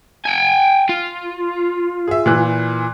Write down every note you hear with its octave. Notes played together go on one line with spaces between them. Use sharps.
G5 G#5
F4
G#4 E5
A#2 E3 F#6